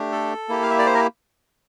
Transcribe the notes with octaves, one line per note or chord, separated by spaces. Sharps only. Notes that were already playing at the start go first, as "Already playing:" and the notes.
Already playing: A3 D4 G4
A4
A#3 E4 G4
F5
E5
D5
C5
A#4